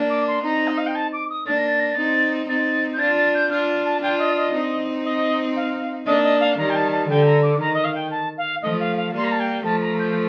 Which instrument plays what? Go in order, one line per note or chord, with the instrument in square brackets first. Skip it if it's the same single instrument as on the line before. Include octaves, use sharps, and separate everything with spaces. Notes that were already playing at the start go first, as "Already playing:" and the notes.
Already playing: [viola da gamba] A#3 D4
[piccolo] D6
C6
[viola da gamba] C4 D#4 [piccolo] A#5
[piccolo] D#5
F5
G5
A5
D6
D#6
[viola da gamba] A#3 D4 [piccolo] A6
[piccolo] A#6
A6
A#6
A6
[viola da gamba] C4 D#4
[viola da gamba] C4 D#4 [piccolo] A6
[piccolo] G6
[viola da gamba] D4 F4 [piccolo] A6
[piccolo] A6
G6
[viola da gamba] D4 F4 [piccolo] F6
[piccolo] F6
A5
[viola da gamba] D4 F4 [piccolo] G5
[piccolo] D#5
D#5
[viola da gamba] C4 D#4
[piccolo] D#5
F5
[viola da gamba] A#3 D4 [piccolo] D#5
[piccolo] D#5
F5
[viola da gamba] D#3 G3 [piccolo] A#5
[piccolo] G5
A5
A5
[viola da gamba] D3 [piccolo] G5
[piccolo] A#5
D6
[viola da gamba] D#3 [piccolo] A#5
[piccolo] D#5
F5
G5
A5
F5
[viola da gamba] F3 A3 [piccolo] D#5
[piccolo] F5
F5
[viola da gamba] G3 A#3 [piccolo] C6
[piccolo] A#5
A5
G5
[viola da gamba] F3 A3 [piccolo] A5
[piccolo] A#5
G6